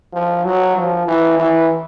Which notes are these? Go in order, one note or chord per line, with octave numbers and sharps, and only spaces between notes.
F3
F#3
F3
E3
E3